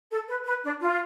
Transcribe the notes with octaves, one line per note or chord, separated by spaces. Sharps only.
A4
B4
B4
D4
F4